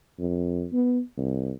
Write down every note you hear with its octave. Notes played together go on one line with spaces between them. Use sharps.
F2
B3
C2